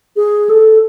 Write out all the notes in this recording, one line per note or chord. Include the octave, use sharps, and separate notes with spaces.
G#4
A4